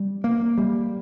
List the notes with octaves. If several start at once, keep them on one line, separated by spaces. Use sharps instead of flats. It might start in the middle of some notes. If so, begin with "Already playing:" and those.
Already playing: G3
A#3
G3